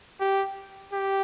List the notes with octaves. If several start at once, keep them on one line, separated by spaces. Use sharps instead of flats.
G4
G4